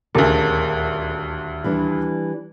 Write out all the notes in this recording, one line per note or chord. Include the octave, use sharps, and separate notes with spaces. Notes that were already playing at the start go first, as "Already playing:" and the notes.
D#1 D2 G#4 A#4
E3 G3 D4